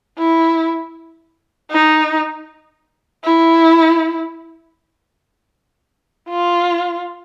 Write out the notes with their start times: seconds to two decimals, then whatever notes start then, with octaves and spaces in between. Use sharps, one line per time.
0.19 E4
1.71 D#4
3.24 E4
6.29 F4